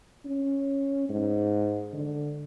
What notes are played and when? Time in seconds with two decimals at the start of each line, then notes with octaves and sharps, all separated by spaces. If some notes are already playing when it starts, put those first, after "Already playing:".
0.25 C#4
1.09 G#2
1.93 D3